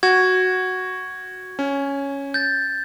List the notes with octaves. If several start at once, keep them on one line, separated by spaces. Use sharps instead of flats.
F#4 G#6
C#4
G6 A6